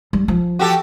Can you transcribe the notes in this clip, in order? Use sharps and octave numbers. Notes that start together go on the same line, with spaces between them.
G3
F3
F#4 G4 A4